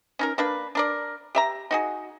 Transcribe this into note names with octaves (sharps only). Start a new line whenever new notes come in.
C#4 D#4 A#4
A#3 D4 B4
D4 A#4 D5
G4 E5 A#5
D#4 F#4 G#4